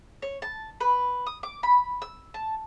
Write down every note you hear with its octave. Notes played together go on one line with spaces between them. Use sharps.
C#5
A5
B4
D#6
D6
B5
E6
A5